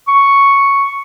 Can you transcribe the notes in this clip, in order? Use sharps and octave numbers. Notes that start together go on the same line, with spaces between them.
C#6